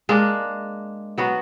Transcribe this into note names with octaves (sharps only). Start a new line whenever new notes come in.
G#3 A#3 D4
F#3 B3 F#4